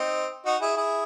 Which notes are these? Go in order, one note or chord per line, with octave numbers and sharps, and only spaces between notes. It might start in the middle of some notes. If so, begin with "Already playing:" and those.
Already playing: C4 D#4
D#4 F#4
E4 G#4
E4 G#4